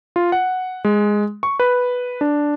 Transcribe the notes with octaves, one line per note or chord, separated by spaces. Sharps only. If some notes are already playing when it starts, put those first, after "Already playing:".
F4
F#5
G#3
C#6
B4
D4